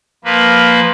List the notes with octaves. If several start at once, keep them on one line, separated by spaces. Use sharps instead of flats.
F3 A#3 B4